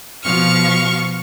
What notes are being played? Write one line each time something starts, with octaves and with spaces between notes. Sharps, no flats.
B2 F3 F5 C#6 F6